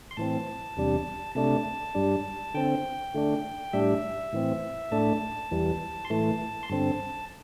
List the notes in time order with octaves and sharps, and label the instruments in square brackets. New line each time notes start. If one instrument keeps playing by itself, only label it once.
[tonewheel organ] C6
A2 E3 C4 A5
E2 C3 G3 D4
C3 A3 D4 A5
G2 G3 D4
D3 C4 G5
D3 A3 D4
A2 G3 D4 E5
A2 E3 C4
A2 A3 D4 A5
E2 E3 G3
C6
A2 E3 A3 A5
C6
G2 D3 C4 A5